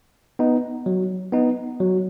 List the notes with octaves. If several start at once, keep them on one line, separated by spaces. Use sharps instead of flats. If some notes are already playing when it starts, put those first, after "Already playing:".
B3 D#4
F#3
B3 D#4
F#3